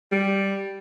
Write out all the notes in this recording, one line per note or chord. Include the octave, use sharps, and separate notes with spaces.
G3